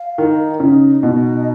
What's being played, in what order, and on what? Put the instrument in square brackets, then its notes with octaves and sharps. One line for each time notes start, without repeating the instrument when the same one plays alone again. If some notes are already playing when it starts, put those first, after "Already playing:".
Already playing: [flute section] F5
[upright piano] D#3 [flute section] D#4
[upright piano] C#3 [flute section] D#4
[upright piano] B2 [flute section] D#5